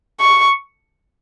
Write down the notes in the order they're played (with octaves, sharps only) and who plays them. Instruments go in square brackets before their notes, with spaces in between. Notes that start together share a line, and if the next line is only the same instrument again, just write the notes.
[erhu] C#6